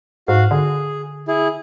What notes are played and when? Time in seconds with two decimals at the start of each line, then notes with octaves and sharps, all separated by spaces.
0.28 G#2 F#4 F5
0.51 D3 G#4
1.28 E4 G#4